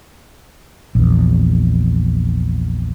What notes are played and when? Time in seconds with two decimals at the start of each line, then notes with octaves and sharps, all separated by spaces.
0.95 A#1 E2